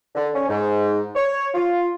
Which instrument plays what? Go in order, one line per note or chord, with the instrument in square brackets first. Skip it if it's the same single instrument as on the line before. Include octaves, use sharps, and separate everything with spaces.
[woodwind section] D3
C#4
G#2
C#5
F4